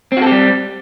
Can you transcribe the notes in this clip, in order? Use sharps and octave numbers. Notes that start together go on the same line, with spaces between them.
G3 C4 F#4 G4 A4